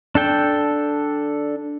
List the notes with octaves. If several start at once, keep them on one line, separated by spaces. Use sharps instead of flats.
D4 A4 G5